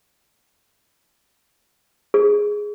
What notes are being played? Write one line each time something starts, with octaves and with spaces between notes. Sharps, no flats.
G#4